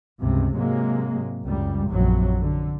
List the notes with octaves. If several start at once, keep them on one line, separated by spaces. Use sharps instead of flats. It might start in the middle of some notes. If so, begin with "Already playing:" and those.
C#2 G2 C3
G#2 C3 F#3 G#3 A#3
C#2 F#2 G3
A#1 F#2 C3 F#3
D3